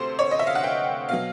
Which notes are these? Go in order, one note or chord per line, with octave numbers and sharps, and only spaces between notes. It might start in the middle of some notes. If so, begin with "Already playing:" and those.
Already playing: D2 C3 A3 C5
C#5
D#5
E5
F5
F#5
G5
B2 F#3 F5